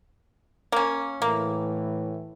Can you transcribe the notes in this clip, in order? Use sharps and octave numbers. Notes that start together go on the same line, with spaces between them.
A#3 C#4
A2 E3 A#3